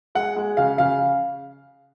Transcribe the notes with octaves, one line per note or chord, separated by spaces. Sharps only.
G#3 F#5
G#3
C#3 F5
C#3 F5